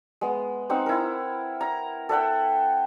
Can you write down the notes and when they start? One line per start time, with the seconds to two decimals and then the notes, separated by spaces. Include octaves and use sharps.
0.21 G#3 B3
0.69 C4 D#4 F#5 E6
0.86 E4 A#4
1.61 A#5
2.09 A4 E5 F#5 G5